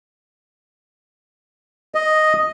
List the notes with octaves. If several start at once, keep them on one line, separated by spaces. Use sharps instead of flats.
D#5